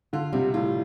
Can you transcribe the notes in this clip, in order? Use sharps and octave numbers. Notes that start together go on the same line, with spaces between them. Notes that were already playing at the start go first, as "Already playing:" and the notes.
D3 F4
C3 G3
A2 F4